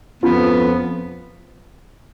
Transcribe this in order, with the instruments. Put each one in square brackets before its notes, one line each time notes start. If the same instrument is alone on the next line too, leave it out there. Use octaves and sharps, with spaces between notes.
[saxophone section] F2 F3 B3 [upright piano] C#4 F4